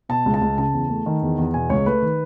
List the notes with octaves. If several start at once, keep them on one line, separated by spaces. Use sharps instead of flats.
B2 A5
C#2
A5
C#2
C#3 A5
E2
A3
D#3
E2
E2
B2 G#5
C#2 C#5
A3 B4
D#3